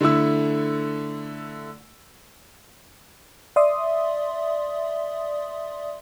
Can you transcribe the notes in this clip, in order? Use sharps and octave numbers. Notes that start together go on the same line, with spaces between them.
D3 A3 E4 E6
D5 E5 C6 D#6